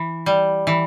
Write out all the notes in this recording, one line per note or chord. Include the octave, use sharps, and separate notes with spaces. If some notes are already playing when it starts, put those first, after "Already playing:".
Already playing: E3
G3
E3